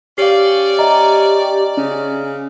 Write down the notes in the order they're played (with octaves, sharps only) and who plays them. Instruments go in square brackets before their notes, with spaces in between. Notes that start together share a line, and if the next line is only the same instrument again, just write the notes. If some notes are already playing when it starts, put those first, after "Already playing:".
[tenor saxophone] C#4 [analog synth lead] G4 [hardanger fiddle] D5 [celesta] F5 C7
[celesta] D#5 E5 A#5
[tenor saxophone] C#3 [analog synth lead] C#4